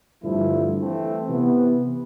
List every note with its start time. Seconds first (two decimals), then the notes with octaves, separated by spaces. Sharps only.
0.23 G2 D3 F3 A3 E4
0.76 E3 A3 C4
1.29 C3 E3 B3